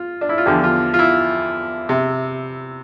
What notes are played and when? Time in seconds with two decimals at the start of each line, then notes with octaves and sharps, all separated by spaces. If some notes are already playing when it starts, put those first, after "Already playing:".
Already playing: F4
0.21 D4
0.29 E4
0.38 F4
0.46 E2 D3 F3 G4
0.64 F4
0.94 F4
0.99 E4
1.89 C3